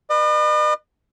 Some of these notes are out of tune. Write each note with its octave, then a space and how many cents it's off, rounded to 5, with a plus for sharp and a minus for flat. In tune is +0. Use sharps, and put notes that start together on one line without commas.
B4 +0 D#5 -45